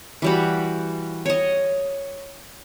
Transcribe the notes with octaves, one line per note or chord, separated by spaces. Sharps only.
E3 G3 F#4
C#5 D#5